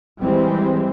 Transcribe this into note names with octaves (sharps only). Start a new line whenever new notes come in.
E3 G3 G#3 C4